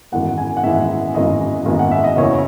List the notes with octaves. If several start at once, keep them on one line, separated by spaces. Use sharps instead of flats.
G#1 F#2 E3 G#3 B3 F#5
G#5
F#5
G#1 F#2 E3 G#3 B3 E5
G#1 F#2 E3 G#3 B3 D#5
G#1 F#2 E3 G#3 B3
F#5
E5
D#5
F#1 E2 C#3 E3 C#5